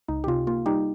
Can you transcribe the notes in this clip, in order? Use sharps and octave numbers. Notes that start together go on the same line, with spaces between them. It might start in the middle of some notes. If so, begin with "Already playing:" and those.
C#2 D#4
G4
C3 F4
A#3 F4
G3 D#4 G4